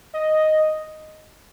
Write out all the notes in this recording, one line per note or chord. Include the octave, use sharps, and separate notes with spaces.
D#5